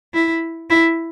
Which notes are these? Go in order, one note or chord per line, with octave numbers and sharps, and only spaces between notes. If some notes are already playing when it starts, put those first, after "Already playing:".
E4
E4